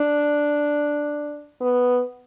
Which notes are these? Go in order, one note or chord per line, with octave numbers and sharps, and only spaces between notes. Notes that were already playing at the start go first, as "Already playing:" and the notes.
Already playing: D4
B3